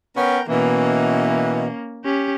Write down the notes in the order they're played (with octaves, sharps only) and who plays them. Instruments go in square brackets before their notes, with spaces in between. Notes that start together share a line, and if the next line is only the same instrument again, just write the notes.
[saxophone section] B3 C#4 [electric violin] A#4 G5
[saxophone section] B2 E3 [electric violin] A#3 C#4
[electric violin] C#4 G4